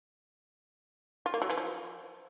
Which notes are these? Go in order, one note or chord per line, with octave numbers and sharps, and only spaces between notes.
F4
A#3
F#3
E3
F3